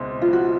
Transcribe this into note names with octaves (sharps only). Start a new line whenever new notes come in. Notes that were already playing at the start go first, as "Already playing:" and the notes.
Already playing: C#2 B2 G#3 C4 E4
F4
F#4